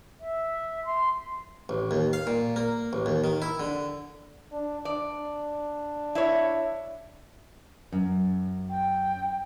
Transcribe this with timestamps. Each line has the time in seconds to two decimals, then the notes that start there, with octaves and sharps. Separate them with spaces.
0.20 E5
0.85 C6
1.69 A1
1.91 D#2
2.13 F5
2.27 A#2
2.56 A#3
2.93 A1
3.06 D#2
3.24 D#3
3.42 E4
3.60 D3
4.52 D4
4.85 D4 D5
6.15 E4 C#5
7.92 F#2
8.70 G5